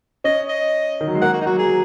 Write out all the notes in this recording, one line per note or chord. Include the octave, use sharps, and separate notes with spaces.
C#4 D#5
D#5
D#3
F#3
G#3
A#3 F#5
F#4
D#4
F#3 F#4
G#4
F#3